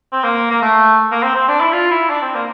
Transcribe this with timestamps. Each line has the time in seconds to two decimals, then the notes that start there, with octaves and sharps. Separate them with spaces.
0.13 C4
0.24 A#3
0.51 A#3
0.62 A3
1.12 A#3
1.23 C4
1.35 C4
1.48 D4
1.61 E4
1.73 F4
1.91 E4
2.10 D4
2.22 C4
2.35 A#3